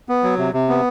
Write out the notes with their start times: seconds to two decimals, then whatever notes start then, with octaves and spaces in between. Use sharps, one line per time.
0.09 B3
0.23 F#3
0.38 C3
0.53 C3
0.69 B3